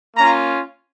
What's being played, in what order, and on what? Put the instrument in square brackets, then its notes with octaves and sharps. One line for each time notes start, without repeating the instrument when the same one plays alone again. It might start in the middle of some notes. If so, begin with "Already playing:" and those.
[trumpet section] A#3 C#4 F4 A#5